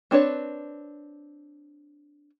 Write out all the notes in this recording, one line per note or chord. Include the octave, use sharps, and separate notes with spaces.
C4 D4 B4 C#5